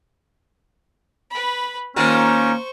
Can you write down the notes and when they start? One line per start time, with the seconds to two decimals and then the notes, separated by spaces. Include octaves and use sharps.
1.30 B4 B5
1.96 D#3 A#3 C#4 F4 A#4 C5 C#6